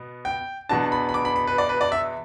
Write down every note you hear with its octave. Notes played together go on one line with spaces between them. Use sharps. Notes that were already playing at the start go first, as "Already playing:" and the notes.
Already playing: B2 B3
G5
E2 B2 B3 D4 A5
B5
B5
D6
B5
B5
B4
D5
B4
D5
E5